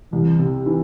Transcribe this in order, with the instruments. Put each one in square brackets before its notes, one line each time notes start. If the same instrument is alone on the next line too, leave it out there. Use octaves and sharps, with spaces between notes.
[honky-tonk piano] C2 [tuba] E3
[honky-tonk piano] C3
E3